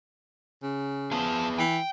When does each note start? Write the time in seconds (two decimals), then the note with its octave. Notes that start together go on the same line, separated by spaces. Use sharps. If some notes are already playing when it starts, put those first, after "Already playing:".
0.63 C#3
1.12 F3 B3 G#4
1.59 E3 G5